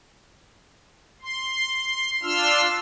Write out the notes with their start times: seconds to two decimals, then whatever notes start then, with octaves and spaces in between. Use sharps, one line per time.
1.22 C6
2.23 D4 F4 C6 E6 F6